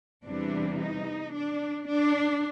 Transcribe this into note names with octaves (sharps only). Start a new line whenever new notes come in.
E2 C3 E3 G3 D4
D#4
D4
D4